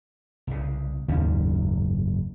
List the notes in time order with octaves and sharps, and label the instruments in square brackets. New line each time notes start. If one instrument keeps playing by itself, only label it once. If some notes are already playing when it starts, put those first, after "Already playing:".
[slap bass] C2 C#3
[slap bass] F#1 G#2 C#4 [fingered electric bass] D#2